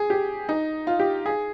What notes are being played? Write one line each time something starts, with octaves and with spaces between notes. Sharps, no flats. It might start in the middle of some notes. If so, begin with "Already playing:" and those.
Already playing: G#4
G4
D#4
F4
G4
G#4